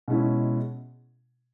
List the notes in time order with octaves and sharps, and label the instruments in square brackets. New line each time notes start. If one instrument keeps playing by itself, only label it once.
[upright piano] B2 G#3 C#4 E4